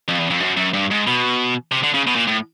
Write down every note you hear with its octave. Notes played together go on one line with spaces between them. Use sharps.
F2
E2
F2
F#2
F#2
G2
G#2
B2
C3
D3
C#3
B2
A#2
A2